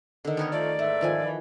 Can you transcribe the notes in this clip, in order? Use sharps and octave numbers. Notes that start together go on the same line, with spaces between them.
D3 D#3
D#3 B3 A4 A#4 C#5
F3 A3 D5
G#2 E3 A3 E5
D#3 F3 G#5
E3